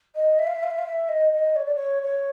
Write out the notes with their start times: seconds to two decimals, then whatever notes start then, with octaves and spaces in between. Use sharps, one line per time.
0.16 D#5
0.39 E5
0.47 F5
0.55 E5
0.63 F5
0.70 E5
0.78 F5
0.86 E5
1.09 D#5
1.33 D#5
1.56 C#5
1.65 D5
1.75 C#5
2.02 C#5